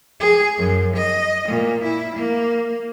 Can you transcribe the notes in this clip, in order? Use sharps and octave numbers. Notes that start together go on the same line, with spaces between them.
G#4
F#2
D#5
A#2
E4
A#3